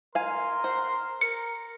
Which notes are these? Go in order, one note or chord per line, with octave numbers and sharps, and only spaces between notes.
A#4 F5 G#5 C6
C5 F#5
A#4 C#7